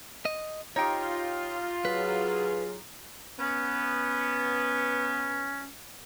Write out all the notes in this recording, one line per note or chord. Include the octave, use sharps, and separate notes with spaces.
D#5
D#4 F4 G4 C#5 G5
F#3 G#4 B4
B3 C#4